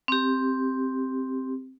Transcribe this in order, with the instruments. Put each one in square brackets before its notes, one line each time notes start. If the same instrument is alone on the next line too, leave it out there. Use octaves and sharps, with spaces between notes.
[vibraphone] C4 G4